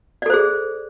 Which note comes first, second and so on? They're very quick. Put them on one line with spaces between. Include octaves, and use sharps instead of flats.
D5 A4 C5 G#4